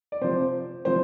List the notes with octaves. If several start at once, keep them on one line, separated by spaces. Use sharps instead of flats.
D5
C3 F3 C5
C3 F3 C5